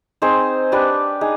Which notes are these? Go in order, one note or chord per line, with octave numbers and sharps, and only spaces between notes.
C4 D#4 G#4 C5
D4 G4 B4
D#4 G#4